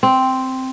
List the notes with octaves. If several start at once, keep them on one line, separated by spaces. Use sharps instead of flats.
C4